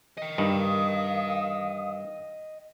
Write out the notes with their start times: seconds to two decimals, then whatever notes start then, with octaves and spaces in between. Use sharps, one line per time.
0.18 D#5 G5
0.38 G2 D#3 F5 D#6